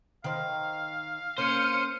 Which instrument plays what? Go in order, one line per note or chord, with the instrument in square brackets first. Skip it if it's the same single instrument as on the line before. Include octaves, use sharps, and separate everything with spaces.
[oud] D#3 C5 [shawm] F5
[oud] A#3 C#4 [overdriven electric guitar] C5 [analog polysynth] F6 C#7 D#7